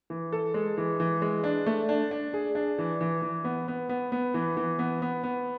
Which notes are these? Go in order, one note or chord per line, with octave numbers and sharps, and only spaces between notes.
E3
A4
G#3
E3
E3
G#3
D4
A3
D4
D4
G#4
D4
E3
E3
E3
B3
B3
B3
B3
E3
E3
B3
B3
B3